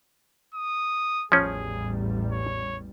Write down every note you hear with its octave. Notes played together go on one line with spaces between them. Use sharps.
D#6
A1 E2 F3 G3 C#4 G#4
C#5